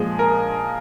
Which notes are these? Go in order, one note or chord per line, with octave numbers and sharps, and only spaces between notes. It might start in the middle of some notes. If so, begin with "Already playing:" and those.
Already playing: A#2 F3 G#3 G#4
A#4